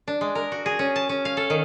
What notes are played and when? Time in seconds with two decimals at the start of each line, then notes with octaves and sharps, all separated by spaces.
0.08 D4
0.21 G#3
0.35 A#4
0.52 F#4
0.66 G#4
0.79 C#4
0.96 A5
1.09 C#4
1.25 F5
1.37 A4
1.50 D#3